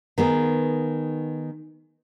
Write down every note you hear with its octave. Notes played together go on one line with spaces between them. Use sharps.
D#3 B3 G#4